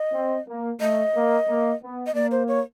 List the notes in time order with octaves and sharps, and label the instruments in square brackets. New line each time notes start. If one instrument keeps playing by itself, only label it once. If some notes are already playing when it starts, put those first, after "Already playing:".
Already playing: [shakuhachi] D#5
[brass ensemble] C4
A#3
[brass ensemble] A3 [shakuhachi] D#5
[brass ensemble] A#3
A#3
B3
[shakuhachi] D#5
[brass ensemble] A#3 [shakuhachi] D5
[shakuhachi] C5
C#5